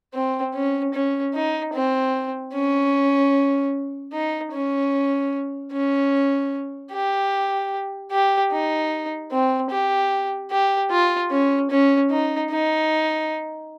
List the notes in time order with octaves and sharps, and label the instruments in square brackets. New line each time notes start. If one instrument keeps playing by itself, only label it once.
[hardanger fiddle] C4
C#4
C#4
D#4
C4
C#4
D#4
C#4
C#4
G4
G4
D#4
C4
G4
G4
F4
C#4
C#4
D#4
D#4